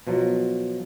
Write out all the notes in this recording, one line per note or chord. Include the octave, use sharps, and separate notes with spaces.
B2 F3 F#3